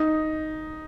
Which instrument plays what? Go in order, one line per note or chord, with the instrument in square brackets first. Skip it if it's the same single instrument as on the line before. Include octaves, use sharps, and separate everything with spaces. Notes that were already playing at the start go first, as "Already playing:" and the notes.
Already playing: [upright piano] D#4